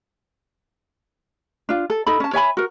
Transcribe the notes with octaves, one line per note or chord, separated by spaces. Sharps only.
D4 F4
A4
D#4 A4 B5
C#4 A5
C#5 E5 G#5 B5
F#4 A#4